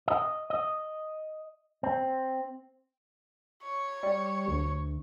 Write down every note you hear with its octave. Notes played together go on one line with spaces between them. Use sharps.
D#5
D#5
C4
C#5
G3
D2